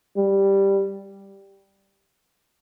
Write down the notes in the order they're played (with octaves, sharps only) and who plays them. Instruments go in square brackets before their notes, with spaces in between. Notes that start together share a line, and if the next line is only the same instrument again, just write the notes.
[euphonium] G3